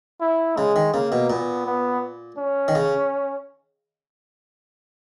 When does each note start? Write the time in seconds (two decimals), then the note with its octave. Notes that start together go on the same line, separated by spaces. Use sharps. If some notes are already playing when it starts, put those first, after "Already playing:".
0.21 E4
0.57 C#3 G#3
0.76 D#3
0.94 C#3 A#3
1.12 B2
1.30 A#2 B3
1.66 B3
2.38 C#4
2.68 D#3
2.75 C#3